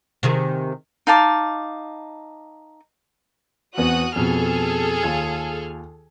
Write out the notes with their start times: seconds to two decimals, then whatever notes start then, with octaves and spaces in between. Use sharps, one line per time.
0.23 C3 D#3 G#4
1.07 D#4 F5 A5 D6
3.78 E2 B3 C4 F#4 D#6 F#6
4.16 F2 B2 G#4 A4 F6
5.03 D#2 F4 G#6